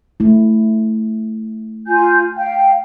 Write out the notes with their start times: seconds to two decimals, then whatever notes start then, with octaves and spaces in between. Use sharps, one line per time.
0.20 A3 E4
1.87 F4 G#5 G6
2.37 F5 G5